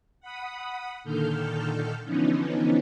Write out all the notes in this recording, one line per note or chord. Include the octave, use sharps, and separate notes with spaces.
F#5 B5 D#6
A#2 D3 D#3 A4 F6 G6
D3 E3 F3 B3 C#4 D#4